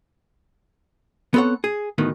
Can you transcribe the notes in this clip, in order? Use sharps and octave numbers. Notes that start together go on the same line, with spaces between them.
B3 C4 A4 C#5 F#5
G#4
D2 A2 D#3 B3